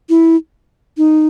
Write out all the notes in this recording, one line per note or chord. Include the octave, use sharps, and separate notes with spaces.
E4
D#4